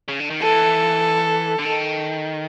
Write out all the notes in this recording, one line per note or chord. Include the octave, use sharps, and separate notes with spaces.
C#3
D3
D#3
E3 A4
D3
D#3